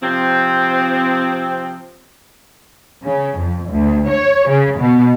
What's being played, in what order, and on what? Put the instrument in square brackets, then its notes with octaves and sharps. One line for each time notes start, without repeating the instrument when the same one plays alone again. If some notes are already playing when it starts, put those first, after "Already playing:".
[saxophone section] C3 F3 C4
[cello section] C#3
F2
D2
C#5
C#3
B2